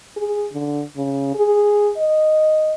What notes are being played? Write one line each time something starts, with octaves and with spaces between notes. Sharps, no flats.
G#4
D3
C#3
G#4
D#5